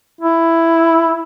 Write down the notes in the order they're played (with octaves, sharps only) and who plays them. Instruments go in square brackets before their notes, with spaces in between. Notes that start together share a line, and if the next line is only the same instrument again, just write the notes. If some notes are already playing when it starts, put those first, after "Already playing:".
[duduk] E4